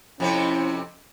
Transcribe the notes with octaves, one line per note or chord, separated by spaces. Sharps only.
F2 C3 C4 C#4 E4